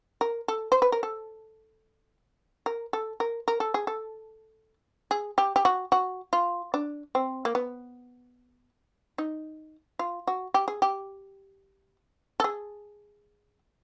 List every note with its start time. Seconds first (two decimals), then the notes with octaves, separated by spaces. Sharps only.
0.21 A#4
0.48 A4
0.72 C5
0.82 B4
0.92 A#4
1.03 A4
2.66 A#4
2.93 A4
3.20 A#4
3.48 A#4
3.60 A4
3.74 G#4
3.87 A4
5.11 G#4
5.38 G4
5.56 G4
5.65 F#4
5.92 F#4
6.33 F4
6.74 D4
7.15 C4
7.45 A#3
7.55 B3
9.18 D#4
9.99 F4
10.27 F#4
10.54 G4
10.68 G#4
10.82 G4
12.40 A4
12.44 G#4